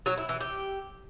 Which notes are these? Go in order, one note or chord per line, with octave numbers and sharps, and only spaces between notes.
F#3
E4
E3
G4